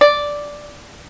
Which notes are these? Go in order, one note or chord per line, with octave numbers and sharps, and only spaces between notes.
D5